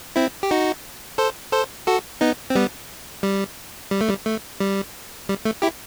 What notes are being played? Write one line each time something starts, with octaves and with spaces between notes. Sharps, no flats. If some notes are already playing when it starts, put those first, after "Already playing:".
C4 E4
G4
D#4 F#4
A4 C5
A4 C5
F#4 A4
B3 D#4
C4
G3 B3
G3
G3
A3
G3
A3
G3
G3
A3
E4 G4